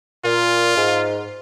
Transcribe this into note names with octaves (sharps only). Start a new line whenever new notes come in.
A#2 F4
G#2